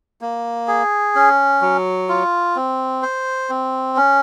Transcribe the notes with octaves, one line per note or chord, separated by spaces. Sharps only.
A#3
G#4
C#4
F#3
F4
C4
C5
C4
C#4